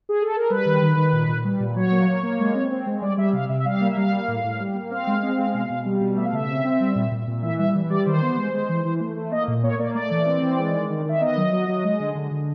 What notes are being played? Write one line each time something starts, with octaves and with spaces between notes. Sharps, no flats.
G#4
A4
A#4
G3 B4
D#3
D#3
D#3
A#2
A#2
G3
A#2
F#3 C#5
A#3
A#3
A#3
G#3
C4
C4
G#3
G3 D5
G3 E5
C3 F5
C3 E5
E5
G3 F5
A#3 E5
G3 F5
A#3
A2
A2
G3
A#3
C4 F5
G#3
C4
G#3
B2
B2
G3
B2
A3 E5
F5
C#3 E5
C4
C4
G3
A#2
A#2
A#2
E3 E5
G3 E5
E3
G3 D5
D#3 C5
B3
G#3
G#3
E3
E3
A3
A3
A#3 D#5
A#2
A#3 C#5
A#3 D5
A3 D5
E3
C4
E3
G#3
D#3
D#3
D#3 E5
B3 D#5
F#3
F#3
F#3
G#3
D3
D3
D3